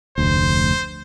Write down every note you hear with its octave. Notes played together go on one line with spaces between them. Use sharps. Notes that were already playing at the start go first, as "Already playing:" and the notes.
F1 D2 C5